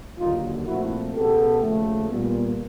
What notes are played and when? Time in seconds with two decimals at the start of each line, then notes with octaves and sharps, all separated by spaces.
0.19 D#2 D3 F#3 A#3 D#4 F4
0.66 A#2 F3 A3 C4 E4 F#4
1.14 C#2 B2 G#3 B3 G4 A4
1.61 D#2 C#3 F3 A3
2.09 A#2 G3 B3